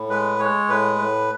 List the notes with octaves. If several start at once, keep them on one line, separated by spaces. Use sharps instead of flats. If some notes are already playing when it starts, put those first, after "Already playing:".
Already playing: A2
G#3 B4
G#3 C#5
A2 B4
A2